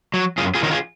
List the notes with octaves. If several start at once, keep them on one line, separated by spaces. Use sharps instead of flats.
F#3
F#2 F4 G#4
F4 G#4
D#3 F#3 A#4
F4 G#4